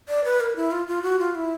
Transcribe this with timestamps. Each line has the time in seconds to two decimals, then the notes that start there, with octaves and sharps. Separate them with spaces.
0.09 D5
0.24 B4
0.40 A#4
0.56 E4
0.71 F4
0.88 F4
1.03 F#4
1.19 F4
1.35 E4